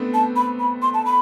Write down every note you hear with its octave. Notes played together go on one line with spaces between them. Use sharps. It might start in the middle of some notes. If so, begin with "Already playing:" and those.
Already playing: A3 B3 C4 D4
A5
B5
B5
C6
A5
B5